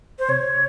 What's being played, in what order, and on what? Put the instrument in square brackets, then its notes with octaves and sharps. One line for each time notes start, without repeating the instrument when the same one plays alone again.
[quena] C5
[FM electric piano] C3 [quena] C#5